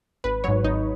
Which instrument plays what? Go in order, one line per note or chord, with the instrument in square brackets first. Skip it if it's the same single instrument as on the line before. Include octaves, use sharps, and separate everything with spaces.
[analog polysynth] G#1 B4
G#2 F#3 C#5
G#1 D#4